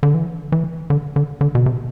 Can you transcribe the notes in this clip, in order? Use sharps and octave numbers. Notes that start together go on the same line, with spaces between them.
D3
E3
E3
D3
D3
D3
B2
C3